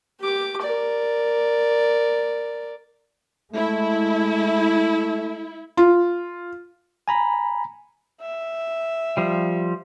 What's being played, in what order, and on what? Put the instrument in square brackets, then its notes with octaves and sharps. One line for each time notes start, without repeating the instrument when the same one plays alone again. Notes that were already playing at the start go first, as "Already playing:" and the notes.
[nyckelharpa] G4 D6
A#4 D5
[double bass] G#3 [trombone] A3 [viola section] E4
[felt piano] F4
[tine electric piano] G#5 A#5 B5
[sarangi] E5
[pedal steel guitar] F3 G3